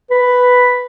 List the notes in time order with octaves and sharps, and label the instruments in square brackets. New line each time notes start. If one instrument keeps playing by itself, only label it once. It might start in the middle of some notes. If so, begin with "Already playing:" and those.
[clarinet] B4